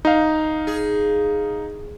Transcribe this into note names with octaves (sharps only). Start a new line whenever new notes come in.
D#4 F5
G#4